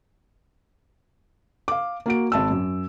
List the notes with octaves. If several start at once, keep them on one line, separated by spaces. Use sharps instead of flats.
F5 D6
A#3 F#4 D7
G#1 A5 E6
F#2